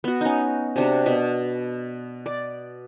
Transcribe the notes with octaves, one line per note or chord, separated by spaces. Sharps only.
B3 F#4
C#4 D#4
C3 D4 F#4
B2
D5